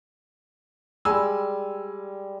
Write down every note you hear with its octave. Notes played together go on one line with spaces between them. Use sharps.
G3 G#3 G#5 E6